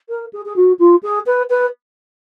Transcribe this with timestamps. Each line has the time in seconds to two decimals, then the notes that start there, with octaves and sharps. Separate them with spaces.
0.09 A#4
0.33 G#4
0.45 G#4
0.56 F#4
0.79 F4
1.03 G#4
1.26 B4
1.50 B4